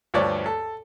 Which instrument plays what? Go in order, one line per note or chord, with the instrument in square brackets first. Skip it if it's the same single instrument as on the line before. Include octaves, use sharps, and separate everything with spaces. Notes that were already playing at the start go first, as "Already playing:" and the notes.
[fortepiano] D2 G2 F3 C#5 D5
A4